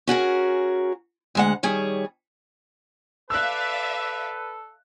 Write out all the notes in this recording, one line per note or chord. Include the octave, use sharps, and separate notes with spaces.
C#4 F#4 G#4 A#4
D2 G#3 F#5
D#3 G3 G#4 C#5
A4 B4 D5 E5 F5 E6 F#6